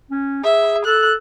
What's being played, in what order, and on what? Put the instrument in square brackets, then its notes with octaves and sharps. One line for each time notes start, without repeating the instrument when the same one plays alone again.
[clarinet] C#4
[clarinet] G#4 [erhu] E5
[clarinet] A4 [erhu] F#6